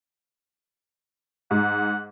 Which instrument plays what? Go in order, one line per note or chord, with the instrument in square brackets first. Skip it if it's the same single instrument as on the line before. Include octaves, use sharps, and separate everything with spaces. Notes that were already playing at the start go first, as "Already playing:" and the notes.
[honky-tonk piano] G#2 [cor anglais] F#5